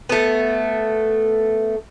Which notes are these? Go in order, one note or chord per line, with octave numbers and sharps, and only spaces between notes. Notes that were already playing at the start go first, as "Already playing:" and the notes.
A3 B3